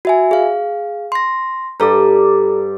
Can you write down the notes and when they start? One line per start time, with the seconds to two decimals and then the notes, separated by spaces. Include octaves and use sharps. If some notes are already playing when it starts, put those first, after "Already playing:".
0.05 F#4 E5 G#5
0.31 G#4 F5
1.12 C6 A#6
1.80 G2 A4 D5 A#5